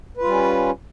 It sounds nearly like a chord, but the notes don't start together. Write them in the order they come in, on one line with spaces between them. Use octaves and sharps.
B4 F4 G3 C#4